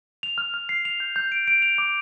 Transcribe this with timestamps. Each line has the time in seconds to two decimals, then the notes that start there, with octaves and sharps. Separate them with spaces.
0.23 F7
0.38 F6
0.54 F6
0.69 C7
0.85 F7
1.00 G6
1.16 G6
1.32 D7
1.48 D7
1.62 F7
1.78 D6